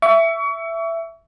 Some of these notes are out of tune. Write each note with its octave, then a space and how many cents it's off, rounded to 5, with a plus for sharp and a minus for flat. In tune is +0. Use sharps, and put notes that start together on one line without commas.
E5 +10 C#6 +35